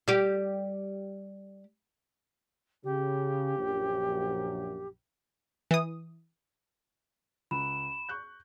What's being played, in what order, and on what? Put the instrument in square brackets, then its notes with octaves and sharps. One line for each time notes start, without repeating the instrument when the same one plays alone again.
[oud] G3 G4
[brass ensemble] C#3 [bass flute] G4
[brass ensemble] A#1 F#2
[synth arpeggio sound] E3 D#6
[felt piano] C#2 [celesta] B5 [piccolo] E7
[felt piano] C#6 F#6 G6